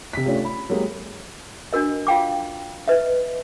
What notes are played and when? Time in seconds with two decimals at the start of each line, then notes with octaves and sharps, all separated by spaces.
0.13 C3 B6
0.26 A3 C#4 D4 F4 G4
0.45 B5
0.69 F#3 G#3 A#3 G4
1.73 D4 F#4 A#4 D#5
2.07 F4 F5 G5 D6
2.88 B4 D#5 E5